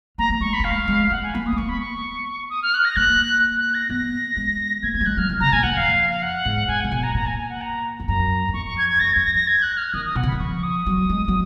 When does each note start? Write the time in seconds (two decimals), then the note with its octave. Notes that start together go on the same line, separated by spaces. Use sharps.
0.18 A#3 A#5
0.30 A#3
0.41 G#3 C#6
0.54 B5
0.60 A#3
0.64 G#3 F5
0.88 G#3
1.10 G#3 F#5
1.23 G#5
1.34 A#3 B5
1.46 D#6
1.52 A#3
1.57 B3 C#6
1.69 B5
1.80 C#6
2.50 D#6
2.63 F6
2.74 F#6
2.85 A#6
2.96 A#3 F#6
3.58 F#6
3.74 A#6
3.89 B3 A#6
4.36 G#3
4.83 A#3 G#6
4.94 A#3 G#6
5.01 F#3
5.06 G#3 F#6
5.17 F#3 F6
5.29 D#3
5.40 C#3 A#5
5.52 A#2 G#5
5.63 F#2 F#5
5.76 F2 F5
6.10 F5
6.22 F#5
6.45 G#2
6.68 G#2 G#5
6.81 A#2 F#5
6.92 B2 G#5
7.03 A#5
7.14 A#2 A#5
7.27 G#5
7.38 G#5
7.49 F#5
7.61 A#5
8.00 F2
8.08 F#2 A#5
8.48 F#2
8.54 F2 C#6
8.66 C#6
8.78 G#6
8.89 G#6
9.00 F#2 A#6
9.13 F2 G#6
9.24 A#6
9.35 A#6
9.48 G#6
9.62 F#6
9.77 F6
9.94 D#3 D#6
10.06 D#6
10.15 B2 F#5
10.23 C#3
10.28 D#3 B5
10.39 F3 C#6
10.63 D#6
10.86 F#3
11.09 G#3
11.28 F#3